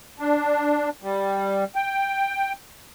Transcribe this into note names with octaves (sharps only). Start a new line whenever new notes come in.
D4
G3
G5